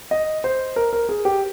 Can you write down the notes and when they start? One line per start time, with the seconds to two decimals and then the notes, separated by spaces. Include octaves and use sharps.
0.11 D#5
0.44 C5
0.76 A#4
0.93 A#4
1.09 G#4
1.25 G4